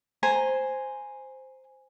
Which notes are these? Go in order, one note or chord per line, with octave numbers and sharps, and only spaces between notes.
C5 G#5 A#5